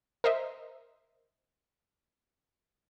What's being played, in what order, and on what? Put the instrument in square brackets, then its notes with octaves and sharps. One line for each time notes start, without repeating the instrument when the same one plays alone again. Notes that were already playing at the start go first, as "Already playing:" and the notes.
[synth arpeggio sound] A#4 C5 D#5 E5